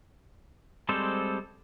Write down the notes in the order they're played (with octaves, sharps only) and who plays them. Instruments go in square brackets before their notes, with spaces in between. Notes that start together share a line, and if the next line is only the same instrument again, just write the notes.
[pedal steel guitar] G3 G#3 C4 A4 C5